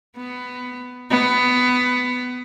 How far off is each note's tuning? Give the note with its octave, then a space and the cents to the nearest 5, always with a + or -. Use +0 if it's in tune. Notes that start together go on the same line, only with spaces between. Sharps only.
B3 +15
B3 +15